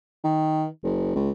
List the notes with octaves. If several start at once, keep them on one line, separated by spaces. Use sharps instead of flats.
D#3
F#1
C#2